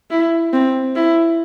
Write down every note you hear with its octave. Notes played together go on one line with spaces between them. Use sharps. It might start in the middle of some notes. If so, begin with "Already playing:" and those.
E4
C4
E4